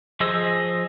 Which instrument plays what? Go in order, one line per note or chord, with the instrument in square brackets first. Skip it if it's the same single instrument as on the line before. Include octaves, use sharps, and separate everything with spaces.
[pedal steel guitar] F3 G#4 C5 D#5 E6